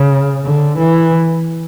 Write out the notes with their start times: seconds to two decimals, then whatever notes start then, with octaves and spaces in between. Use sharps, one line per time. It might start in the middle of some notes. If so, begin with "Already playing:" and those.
Already playing: C#3
0.45 D3
0.78 E3